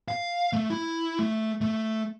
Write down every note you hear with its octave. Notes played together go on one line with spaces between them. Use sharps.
F5
A3
E4
A3
A3